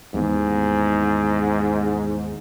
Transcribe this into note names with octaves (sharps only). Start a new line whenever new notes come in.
D#2 G#2 E3 B3